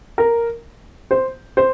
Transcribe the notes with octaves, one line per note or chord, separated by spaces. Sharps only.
A#4
C5
C5